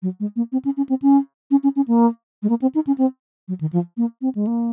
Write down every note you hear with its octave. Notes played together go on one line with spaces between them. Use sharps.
F#3
G#3
A#3
C4
C#4
C#4
C4
C#4
C#4
C#4
C#4
A#3
G#3
A#3
C4
D#4
C#4
C4
F#3
D#3
F3
A#3
C4
G#3
A#3